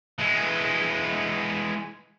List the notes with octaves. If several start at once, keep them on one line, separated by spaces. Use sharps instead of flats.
E3 G#3